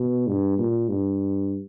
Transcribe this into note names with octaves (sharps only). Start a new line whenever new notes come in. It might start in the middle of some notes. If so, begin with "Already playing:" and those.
Already playing: B2
G2
A#2
G2